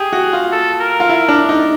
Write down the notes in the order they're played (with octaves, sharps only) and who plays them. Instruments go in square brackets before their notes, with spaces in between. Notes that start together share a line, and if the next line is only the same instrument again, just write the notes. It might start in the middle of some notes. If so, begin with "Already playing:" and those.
Already playing: [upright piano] G4 [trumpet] G#4
[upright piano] F#4
F4
[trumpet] A4
A#4
[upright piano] F4
E4
D4
D#4